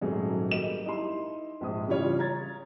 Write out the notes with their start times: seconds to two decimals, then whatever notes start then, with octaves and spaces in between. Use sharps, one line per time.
0.01 D#1 G#2 F#3 A3 G#4
0.51 G3 A#3 G4 D#5 E7
0.85 D#4 E4 G4 C6
1.61 A#1 G#2 D#6
1.88 C#3 E3 G3 F4 C#5
2.19 A#5 G#6 A6